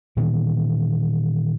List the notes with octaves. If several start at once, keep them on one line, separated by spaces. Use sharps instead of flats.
A#2 D#3 E3 B3